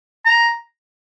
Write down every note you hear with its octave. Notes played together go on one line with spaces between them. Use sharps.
A#5